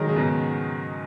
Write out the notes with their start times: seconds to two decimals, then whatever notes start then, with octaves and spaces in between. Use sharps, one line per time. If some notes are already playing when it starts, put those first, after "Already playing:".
Already playing: D#3 F#3 G#3
0.09 C#3
0.16 G#2 B2